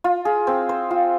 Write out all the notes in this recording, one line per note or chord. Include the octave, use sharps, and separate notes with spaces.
F4
G#4
C4
C5
F4